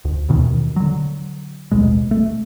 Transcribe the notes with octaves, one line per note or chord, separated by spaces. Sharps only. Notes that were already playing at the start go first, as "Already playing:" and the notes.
D2
D#2 B2 D#3 E3
D3 F#3
A1 D#2 B2 G#3
A3